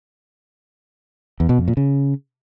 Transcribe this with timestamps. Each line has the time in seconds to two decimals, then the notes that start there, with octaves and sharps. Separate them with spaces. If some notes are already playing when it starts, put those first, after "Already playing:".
1.40 E2
1.49 B2
1.58 F2
1.68 A#2
1.77 C#3